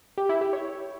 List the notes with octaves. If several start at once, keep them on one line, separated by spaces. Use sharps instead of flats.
G4
E4
G4
C#5